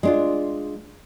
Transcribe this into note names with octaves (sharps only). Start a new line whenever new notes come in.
G#3 D4 F4